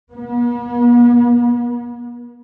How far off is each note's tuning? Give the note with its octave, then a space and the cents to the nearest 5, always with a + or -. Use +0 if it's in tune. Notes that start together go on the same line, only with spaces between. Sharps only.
B3 -45